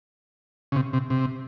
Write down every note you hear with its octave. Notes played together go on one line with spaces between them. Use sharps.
C#3
C3
C3
C3